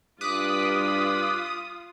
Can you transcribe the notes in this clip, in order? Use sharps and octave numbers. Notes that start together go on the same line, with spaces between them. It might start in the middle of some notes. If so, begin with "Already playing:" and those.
G2 F4 D6 D#6 F#6 B6